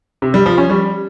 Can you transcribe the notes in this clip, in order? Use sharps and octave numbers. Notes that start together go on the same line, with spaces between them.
C3
G3
F3
C#4
G3